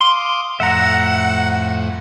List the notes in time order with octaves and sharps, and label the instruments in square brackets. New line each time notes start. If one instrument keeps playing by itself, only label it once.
[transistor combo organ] F5 D6 D#6 [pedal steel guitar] C6
[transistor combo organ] F2 A2 [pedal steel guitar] E5 A#5 [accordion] F#5